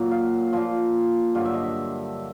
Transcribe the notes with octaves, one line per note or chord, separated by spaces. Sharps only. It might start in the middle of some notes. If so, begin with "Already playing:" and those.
Already playing: A#2 F#3
F5
A#2 F3 F5
G2 D3 F#3 F5
E5
D#5
E5